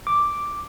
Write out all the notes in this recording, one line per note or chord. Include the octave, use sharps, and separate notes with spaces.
D6